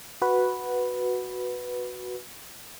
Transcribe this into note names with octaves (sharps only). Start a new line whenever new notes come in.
F#4 B4